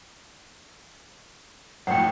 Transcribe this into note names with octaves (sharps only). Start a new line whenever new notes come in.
G#1 F2 A2 F#5 G5